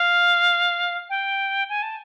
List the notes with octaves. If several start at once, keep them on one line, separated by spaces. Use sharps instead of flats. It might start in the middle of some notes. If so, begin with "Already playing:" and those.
Already playing: F5
G5
G#5
A5